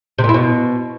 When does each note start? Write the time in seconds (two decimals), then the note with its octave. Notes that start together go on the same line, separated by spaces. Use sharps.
0.18 C3
0.24 A#2
0.29 E4
0.34 B2